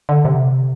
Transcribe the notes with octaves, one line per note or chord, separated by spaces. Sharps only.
D3
C3